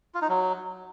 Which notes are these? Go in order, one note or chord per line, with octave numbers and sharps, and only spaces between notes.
F4
D#4
F#3